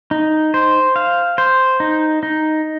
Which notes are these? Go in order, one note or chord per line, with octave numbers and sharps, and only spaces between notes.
D#4
C5
F5
C5
D#4
D#4